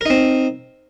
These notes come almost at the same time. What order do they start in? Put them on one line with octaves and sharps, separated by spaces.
A#4 D#4 C4